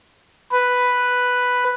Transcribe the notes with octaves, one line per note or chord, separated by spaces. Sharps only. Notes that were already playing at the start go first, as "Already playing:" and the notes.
B4